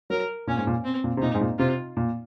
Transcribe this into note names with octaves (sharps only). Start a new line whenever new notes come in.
F#3 A#4
A#2 C#4
G#2
A#2
C4
A#2
C3
A#2 D#4
G#2
A#2
C3 F4
A#2